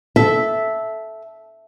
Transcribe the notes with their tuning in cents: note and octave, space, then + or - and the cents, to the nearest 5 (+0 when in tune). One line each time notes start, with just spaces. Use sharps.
A4 -10 E5 +0